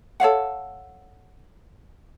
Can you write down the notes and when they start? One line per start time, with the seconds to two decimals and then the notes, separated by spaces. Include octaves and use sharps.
0.20 A4 C#5 F5 F#5